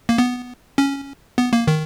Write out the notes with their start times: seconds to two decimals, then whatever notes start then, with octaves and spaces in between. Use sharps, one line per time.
0.09 A#3
0.18 B3
0.78 C#4
1.38 B3
1.53 A#3
1.67 D#3